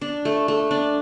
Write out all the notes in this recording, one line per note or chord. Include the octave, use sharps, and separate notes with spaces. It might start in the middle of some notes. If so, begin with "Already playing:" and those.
D4
A3
A3
D4